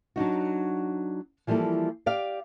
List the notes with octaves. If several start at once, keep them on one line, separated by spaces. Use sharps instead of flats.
F#3 D4 D#4 F#4
E3 F3 G3 A#3 E4 A4
G4 D5 F5